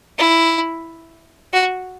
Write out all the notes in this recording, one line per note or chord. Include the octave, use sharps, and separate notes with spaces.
E4
F#4